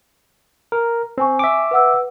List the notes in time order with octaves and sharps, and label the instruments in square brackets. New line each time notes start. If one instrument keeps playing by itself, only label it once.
[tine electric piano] A#4
[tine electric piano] C4 [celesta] G5 G#5 C#6
[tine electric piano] E5 D6
[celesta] B4 F#5 E6